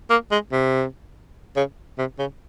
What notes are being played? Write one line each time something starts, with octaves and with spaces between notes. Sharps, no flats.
A#3
G#3
C3
C#3
C3
C#3